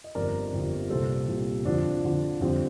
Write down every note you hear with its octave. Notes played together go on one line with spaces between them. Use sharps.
D#5
G1 F2 D3 G3 A#4 D5
G1 F2 D3 G3
C2 A#2 G3 A4 C5
C2 A#2 G3
F2 D3 F3 D4
F2 D3 F3
F2 D3 G3 C4